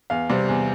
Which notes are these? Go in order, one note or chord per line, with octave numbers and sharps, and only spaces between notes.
E2 F5
C3 G3
E2